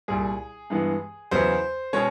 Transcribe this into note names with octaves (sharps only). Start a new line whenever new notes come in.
C2 A#2 G3 G#4
G2 E3 G#3 B3
E2 C#3 F#3 B3 C5
B2 G#3 C#4 C#5